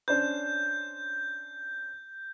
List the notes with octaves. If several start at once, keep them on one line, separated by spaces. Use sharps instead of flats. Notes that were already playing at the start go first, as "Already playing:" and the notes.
C#4 D4 C5 G6